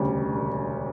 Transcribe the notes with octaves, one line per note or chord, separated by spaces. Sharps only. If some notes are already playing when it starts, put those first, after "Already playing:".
Already playing: E1 D2 C#3 G3
E1